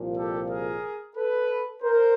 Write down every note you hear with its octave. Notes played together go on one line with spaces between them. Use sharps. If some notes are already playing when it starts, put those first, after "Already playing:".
Already playing: C2 A#2 F3
G4 A4
G#4 A#4
A4 B4
A#4 C5